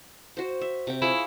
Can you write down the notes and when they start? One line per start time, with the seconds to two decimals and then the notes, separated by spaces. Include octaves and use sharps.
0.37 F#4 C5
0.61 E5
0.87 C3 G5
1.02 E4 F4 G#4 C#5